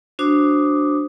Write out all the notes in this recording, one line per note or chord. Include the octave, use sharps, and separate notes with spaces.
D4 F#4 C5 D6 D#6